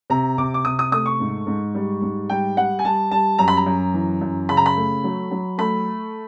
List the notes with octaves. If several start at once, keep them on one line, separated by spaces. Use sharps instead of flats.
C3 A#5
C3 D6
D6
C3 D#6
D#6
A3 D#6
C#6
G#2
G#2
G3
G#2
G3 G5
G3 F#5
G#5
G3 A5
G3 A5
F#2 A#5
B5
A#5
F#2
E3
F#2
C#3 B5
A#5
B5
A3
F#3
F#3
A3 B5